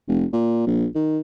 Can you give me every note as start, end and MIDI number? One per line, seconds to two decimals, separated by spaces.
0.08 0.25 29
0.33 0.63 46
0.67 0.86 34
0.95 1.19 51